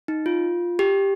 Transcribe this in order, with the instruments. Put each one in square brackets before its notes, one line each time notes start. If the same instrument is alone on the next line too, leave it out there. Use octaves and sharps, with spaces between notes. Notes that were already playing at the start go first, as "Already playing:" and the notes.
[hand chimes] D#4
F4
G4